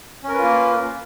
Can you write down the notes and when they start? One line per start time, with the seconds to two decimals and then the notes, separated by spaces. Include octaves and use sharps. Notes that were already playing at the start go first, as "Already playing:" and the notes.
0.24 C#4
0.28 A#4
0.33 B4
0.38 F4
0.43 A#3